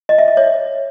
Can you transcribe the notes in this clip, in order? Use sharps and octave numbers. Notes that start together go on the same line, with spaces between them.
D#5
E5
D#5
C#5